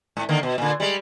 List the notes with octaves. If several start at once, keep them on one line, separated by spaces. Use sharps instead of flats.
G#2
D3 D#3 A#3
B2
A#2 D3
G3 G#3